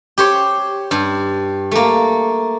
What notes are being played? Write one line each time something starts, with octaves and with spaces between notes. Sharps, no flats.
G4 C5 C#5
G2
A3 A#3